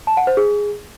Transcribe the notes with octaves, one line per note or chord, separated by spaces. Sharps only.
A5
F#5
C5
G#4